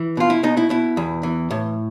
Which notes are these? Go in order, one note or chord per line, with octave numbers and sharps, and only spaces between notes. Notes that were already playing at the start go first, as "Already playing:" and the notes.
Already playing: E3
B2 F4
E4
B2 D#4
E4
B2 E4
E2
E3
A2